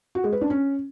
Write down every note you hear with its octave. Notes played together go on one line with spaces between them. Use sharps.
F#4
G#3
B4
D4
C#4